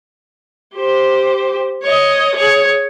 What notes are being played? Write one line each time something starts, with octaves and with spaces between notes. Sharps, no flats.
G4 C5
C#5 D#5
G#4 C#5